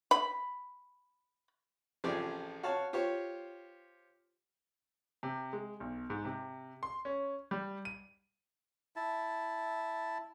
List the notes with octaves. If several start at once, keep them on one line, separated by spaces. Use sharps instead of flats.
B5
A1 C3 F3 G4 G#4 D5
F#4 C#5 F5 F#5 A5
F4 G4 C5 C#5
C3
G#3
B1
G#2
C3
C6
C#4
G3
D#7
E4 A5